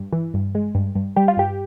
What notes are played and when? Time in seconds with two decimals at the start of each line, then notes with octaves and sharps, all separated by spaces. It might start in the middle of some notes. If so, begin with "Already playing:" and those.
Already playing: G2
0.13 E3
0.34 G2
0.55 G#3
0.75 G2
0.95 G2
1.16 G3 G4
1.28 F4
1.37 G2 G4